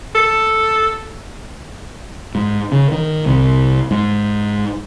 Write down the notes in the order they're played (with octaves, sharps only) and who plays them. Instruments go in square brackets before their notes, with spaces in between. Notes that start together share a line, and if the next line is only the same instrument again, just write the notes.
[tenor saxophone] A4
[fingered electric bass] G#2
C#3
D#3
C2
G#2